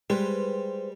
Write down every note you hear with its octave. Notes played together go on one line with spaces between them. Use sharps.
G3 G#3 B4 C5